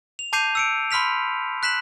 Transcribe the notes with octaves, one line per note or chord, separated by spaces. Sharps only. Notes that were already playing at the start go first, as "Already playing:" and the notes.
F7
A5 D6 G6 C7 D#7 F7
E6 C#7 D7
B5 C6 F6 B6 F7
F#6 B6 E7 F#7